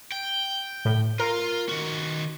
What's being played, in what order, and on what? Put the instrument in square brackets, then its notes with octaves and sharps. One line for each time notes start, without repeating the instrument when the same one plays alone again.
[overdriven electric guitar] G5
[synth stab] A2
[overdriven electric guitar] F4 [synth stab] A#4
[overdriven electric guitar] D#3 F#4